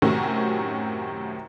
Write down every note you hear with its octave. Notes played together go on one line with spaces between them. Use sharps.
F#2 A2 C3 D#3 C#4 F#4